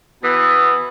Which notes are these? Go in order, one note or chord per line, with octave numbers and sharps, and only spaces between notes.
B2 E3 B3